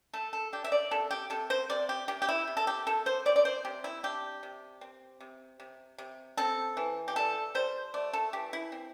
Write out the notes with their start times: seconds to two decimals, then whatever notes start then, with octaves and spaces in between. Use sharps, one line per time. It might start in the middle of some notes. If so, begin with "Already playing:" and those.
0.13 A3 A4
0.33 A4
0.53 D4 G4
0.64 E5
0.72 D5
0.91 C3 A4
1.11 G4
1.30 C3 A4
1.50 C5
1.69 C3 D5
1.89 G4
2.08 C3 G4
2.22 G4
2.29 E4
2.47 C3
2.57 A4
2.67 G4
2.87 C3 A4
3.06 C5
3.26 C3 D5
3.36 D5
3.45 C5
3.65 C3 G4
3.84 E4
4.03 D4 G4
4.43 C3
4.81 C4
5.20 C3
5.60 C3
5.98 C3
6.37 C4 A4
6.77 E3
7.08 G4
7.16 G3 A4
7.55 G3 C5
7.94 A3 D5
8.13 A4
8.33 E3 G4
8.53 E4
8.72 C4